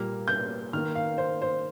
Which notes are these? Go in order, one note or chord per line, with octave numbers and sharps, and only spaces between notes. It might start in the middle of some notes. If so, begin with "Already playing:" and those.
Already playing: A#2 G3 A#3 F6
G6
D#3 A#3 F6
F5
C5
C5